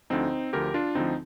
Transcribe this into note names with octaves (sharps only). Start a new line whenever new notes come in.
D2 D3 F3 C4 D#4
D2 D3 F3 G4 A#4
D4 F4
D2 D3 F3 C4 D#4